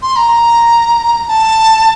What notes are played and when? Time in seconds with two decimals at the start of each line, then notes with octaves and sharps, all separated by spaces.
0.02 C6
0.16 A#5
1.28 A5